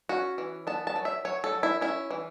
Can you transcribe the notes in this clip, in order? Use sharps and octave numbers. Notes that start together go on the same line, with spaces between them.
C#4 F#4
E3
B3 A5
A5
F#3
E5
F#3 C#5
A4
F#3
E4
C#4 E4
E3